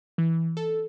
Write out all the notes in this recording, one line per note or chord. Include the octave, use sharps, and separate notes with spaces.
E3
A4